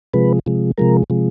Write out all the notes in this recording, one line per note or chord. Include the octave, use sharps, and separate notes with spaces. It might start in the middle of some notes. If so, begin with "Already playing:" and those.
C3 F3 G#3 B4
C3 F3 G#3
C3 F3 G#3 A#4
C3 F3 G#3